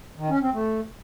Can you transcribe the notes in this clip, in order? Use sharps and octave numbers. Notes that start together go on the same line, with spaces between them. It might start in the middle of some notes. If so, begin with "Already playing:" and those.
D#3
C#4
C4
A3